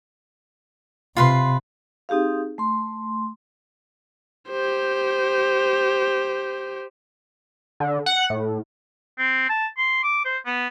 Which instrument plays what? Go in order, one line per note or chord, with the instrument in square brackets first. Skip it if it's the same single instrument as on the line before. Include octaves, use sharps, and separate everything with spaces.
[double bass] C3 [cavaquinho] F4 B4 C6
[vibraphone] C4 D#4 G4 G#4 F5
A3 C6
[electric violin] G4 C5
[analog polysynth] D3
F#5
A2
[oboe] C4
A5
C6
D6
C5
B3